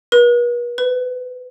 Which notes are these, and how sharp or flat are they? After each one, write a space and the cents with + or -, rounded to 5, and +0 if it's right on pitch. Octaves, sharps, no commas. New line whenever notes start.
B4 -45
B4 +25